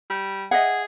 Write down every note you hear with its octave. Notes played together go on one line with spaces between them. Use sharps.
G3
G#4 D#5 E5 F#5